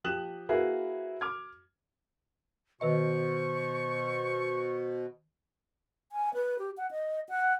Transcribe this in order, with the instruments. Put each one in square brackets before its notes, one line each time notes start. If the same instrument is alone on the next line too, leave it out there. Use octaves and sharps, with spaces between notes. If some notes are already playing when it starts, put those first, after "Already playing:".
[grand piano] F3 G4 D#6 F#6 E7 F#7
A#3 E4 F#4 G#4 A#4 B4
D6 F6 G#6
[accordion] B2 [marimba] D#3 B4 D#5 [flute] C5 [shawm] C#6
[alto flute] G#5
B4
G4
F#5
D#5
F#5